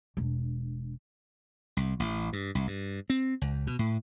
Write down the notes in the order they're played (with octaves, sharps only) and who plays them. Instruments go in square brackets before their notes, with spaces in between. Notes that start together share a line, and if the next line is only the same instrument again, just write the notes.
[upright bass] E1 D4
[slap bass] C2
A1
G2
C2
G2
C4
C#2
B2
A2